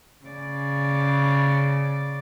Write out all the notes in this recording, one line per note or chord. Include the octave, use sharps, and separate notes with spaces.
C#3 D5